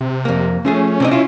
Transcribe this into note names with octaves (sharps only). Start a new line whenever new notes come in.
C3
F2 A#3
F3 A3 C#4 G#4
C3 C4 D#4
E4 F4